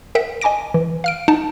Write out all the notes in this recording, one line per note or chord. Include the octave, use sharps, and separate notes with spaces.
A#4 E5 F#5 G5
D#5 G#5 A5 D6 A#6 D7
E3
F5 F6 D7
D#4 F#5 A5